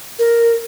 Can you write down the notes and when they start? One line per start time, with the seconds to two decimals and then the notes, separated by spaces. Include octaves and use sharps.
0.19 A#4